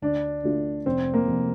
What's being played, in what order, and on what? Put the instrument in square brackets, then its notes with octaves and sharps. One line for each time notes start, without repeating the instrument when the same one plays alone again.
[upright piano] D2 [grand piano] D4
[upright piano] D3 A3 D4 F4
[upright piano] F1 [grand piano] C4
[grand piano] A#3
[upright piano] F2 C3 F3 A#3